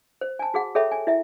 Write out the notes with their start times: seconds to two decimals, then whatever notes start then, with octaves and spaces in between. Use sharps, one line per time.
0.21 C5
0.39 G#5 A5
0.54 F#4 G#4 F#5
0.75 G#4 A4 C#5 E5 G5 B5
0.91 G#5
1.07 E4 E5